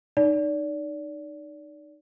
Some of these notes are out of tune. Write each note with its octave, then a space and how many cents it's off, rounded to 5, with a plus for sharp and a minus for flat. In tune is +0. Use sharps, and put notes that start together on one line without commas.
D#4 -25 D5 -25